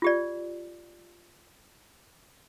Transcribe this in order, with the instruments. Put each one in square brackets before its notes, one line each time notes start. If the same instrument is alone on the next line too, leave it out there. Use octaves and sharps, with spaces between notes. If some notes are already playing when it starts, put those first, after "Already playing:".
[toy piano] F4 G4 D5